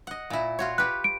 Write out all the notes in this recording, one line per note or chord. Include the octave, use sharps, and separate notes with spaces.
D#5 F#5
A#2 E4
F4 F#4 C#5
G4 B4 F#6
D7